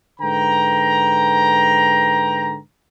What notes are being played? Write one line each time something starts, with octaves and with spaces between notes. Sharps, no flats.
G#2 D3 B4 G5 A#5